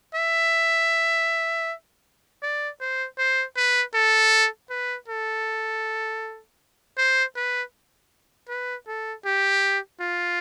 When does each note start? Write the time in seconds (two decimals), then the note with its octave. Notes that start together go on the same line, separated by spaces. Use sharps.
0.15 E5
2.43 D5
2.81 C5
3.18 C5
3.56 B4
3.94 A4
4.70 B4
5.08 A4
6.98 C5
7.36 B4
8.49 B4
8.88 A4
9.25 G4
10.01 F4